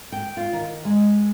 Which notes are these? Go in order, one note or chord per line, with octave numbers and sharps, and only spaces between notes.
G5
F4
D#3
G#3